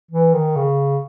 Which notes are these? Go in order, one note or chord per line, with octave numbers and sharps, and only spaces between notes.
E3
D#3
C#3